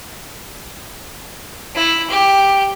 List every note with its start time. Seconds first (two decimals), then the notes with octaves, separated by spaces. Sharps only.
1.75 E4
2.10 G4